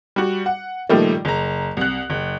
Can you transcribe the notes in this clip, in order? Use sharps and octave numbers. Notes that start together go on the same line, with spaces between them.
G3 F#4
F#5
A#2 D#3 F3 G3 A3
F#1 A#5
C2 F#6
F#1